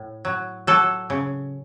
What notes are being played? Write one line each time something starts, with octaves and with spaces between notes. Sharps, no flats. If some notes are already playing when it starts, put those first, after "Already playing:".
Already playing: A2
F#3
F#3 A4
C#3